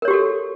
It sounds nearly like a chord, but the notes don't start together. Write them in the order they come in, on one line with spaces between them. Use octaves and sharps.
A#4 C#5 G4 F#4 A4